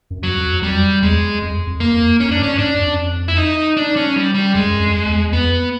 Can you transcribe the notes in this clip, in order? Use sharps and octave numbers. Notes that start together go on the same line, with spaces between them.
F#2
F#3
F2
F2 G3
E2 G#3
F2
F2
A#3
F2
F#2 C#4
D4
G2
C#4
G2 D4
F2
E4
D#4
D4
C#4
G3
G3
F#2 G#3
F#2
F2
E2
E2
F2 B3